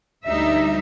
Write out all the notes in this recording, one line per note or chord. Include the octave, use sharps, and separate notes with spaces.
D2 G3 D#4 E5